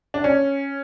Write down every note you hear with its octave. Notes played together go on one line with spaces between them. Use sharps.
D4
C#4